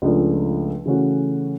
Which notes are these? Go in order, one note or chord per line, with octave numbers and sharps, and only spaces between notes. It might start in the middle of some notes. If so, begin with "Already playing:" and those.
C#2 C#3 F3 A3 D4
C#3 E3 A3 C#4 F#4